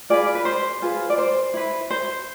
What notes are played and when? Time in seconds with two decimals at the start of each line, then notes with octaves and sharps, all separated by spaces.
0.10 F4 G#4 B4 D5
0.35 B4
0.45 C5
0.82 F4 G#4 B4
1.10 D5
1.18 C5
1.54 E4 B4
1.90 C5